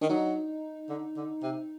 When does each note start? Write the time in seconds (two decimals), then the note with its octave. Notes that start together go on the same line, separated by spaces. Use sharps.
0.01 D#3 D4
0.10 F#3 D#4
0.89 D3
1.17 D3
1.43 C3